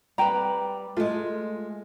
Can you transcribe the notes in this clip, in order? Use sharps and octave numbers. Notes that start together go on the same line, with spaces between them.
G3 C4 B4 G5 A#5
G#3 A3 F4